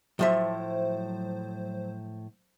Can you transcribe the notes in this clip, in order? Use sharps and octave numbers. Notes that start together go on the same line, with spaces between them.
A2 F3 F#3 C5 E5